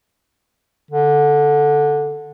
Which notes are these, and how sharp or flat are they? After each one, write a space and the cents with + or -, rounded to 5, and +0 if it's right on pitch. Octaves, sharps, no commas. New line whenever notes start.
D3 +0